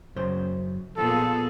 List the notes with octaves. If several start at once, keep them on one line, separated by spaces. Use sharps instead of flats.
F#2 C#3 C5
A#2 F3 B3 F4 G#4 A4